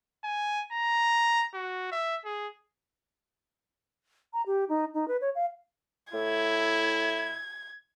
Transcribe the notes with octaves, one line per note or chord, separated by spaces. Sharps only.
G#5
A#5
F#4
E5
G#4
A#5
G4
D#4
D#4
B4
C#5
F5
A2 E4 G#6